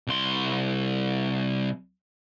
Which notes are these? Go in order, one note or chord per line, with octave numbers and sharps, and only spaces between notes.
C2 C6